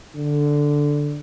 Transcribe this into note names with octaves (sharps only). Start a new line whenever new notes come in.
D3